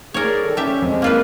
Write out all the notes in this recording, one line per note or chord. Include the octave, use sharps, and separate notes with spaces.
G#4 A#4 C#5 D5
D#3 G3 A4
C#4 G4 E5
F2 G#3
A#3 F4 B4